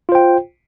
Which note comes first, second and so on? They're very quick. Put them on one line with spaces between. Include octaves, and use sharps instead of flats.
F4 C5 G5